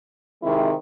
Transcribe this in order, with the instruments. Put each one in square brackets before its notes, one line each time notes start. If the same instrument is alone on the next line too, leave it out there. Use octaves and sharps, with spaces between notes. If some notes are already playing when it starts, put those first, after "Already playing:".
[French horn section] C3 D#3 G#3 C4 E4